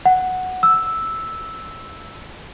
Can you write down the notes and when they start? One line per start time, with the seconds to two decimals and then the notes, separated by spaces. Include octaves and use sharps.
0.05 F#5
0.63 E6